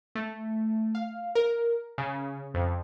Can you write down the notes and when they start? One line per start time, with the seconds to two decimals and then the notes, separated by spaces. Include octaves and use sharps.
0.15 A3
0.95 F5
1.35 A#4
1.98 C#3
2.54 F2